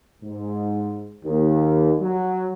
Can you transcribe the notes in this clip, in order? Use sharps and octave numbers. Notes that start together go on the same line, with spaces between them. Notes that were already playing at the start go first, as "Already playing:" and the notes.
G#2
D#2
F#3